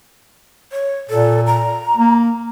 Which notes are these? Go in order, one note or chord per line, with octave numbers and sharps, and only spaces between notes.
C#5
A#2 A4
A#5
A#3